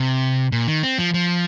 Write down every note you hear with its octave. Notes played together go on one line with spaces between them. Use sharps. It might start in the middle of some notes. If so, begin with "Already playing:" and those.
Already playing: C3
A#2
D#3
C4
F3
F3